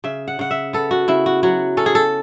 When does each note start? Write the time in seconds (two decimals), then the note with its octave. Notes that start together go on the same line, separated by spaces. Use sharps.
0.04 C#3 E5
0.28 F#5
0.39 C#3 F#5
0.51 E5
0.73 B3 A4
0.91 F#4
1.08 C#3 E4
1.26 F#4
1.43 F#3 F#4
1.77 C#4 A4
1.86 G#4
1.95 A4